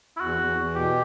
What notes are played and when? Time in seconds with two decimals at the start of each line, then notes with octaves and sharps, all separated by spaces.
0.17 E4
0.20 E2 F#4
0.39 E2
0.57 E2
0.75 B2 G4